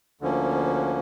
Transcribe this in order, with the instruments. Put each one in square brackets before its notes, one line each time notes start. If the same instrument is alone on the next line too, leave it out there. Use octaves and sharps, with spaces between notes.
[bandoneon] D2 D3 F3 A#3 C#4